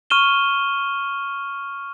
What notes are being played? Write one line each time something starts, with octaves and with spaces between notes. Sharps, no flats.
C#6 F6 D#7 E7 G7